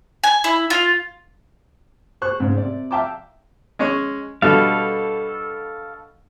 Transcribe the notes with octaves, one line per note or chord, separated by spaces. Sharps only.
G#5
E4
F4
C5 C#6 F#6
G#2 C#3 C4
C3 D5
E5 F5 G5 A5 A#5 D6
G#3 C#4 C#5
B2 D3 G3 A4 F5